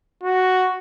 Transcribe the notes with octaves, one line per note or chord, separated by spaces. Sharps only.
F#4